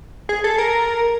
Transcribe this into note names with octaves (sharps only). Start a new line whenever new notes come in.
G#4
A4
A#4